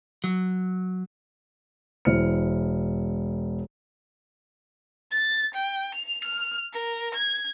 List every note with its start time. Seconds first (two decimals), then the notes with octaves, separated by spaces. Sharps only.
0.24 F#3
2.05 E1 E4 C5 F6 C#7
5.11 A6
5.54 G5
5.95 F7
6.24 F6
6.73 A#4
7.14 G#6